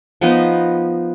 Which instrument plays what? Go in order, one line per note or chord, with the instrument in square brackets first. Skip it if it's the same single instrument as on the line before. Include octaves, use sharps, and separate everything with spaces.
[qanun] F3 B3 D#4